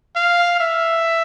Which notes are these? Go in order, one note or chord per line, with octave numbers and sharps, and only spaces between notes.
F5
E5